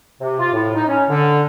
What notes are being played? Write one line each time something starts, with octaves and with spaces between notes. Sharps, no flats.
C3
F4
A2
D#4
C#4
D3